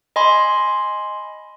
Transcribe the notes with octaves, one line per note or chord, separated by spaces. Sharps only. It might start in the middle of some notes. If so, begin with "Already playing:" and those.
D#5 G#5 B5 C6